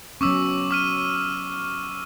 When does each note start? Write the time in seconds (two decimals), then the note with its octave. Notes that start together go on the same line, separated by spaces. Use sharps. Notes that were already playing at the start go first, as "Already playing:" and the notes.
0.21 F#3 B3 C#4 C#6 D6 E6
0.71 D6 F6 D#7